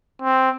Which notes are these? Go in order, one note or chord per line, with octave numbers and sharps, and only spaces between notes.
C4